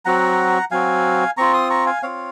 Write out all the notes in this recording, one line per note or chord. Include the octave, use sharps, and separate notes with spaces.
F#3 C4 F#4 F#5 A#5
F#3 C4 F#4 F5 G#5
C4 F4 A#5 C#6
C6 D#6
A#5 C#6
F5 G#5
C4 F4 C#5 F5